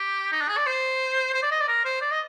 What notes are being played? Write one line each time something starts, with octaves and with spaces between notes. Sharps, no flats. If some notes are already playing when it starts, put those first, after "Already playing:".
Already playing: G4
D#4
D4
G#4
D5
C5
C5
D5
D#5
D5
A#4
C5
D5
D#5